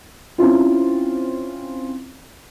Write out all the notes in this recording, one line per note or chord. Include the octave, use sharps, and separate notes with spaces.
C4 C#4 E4 F4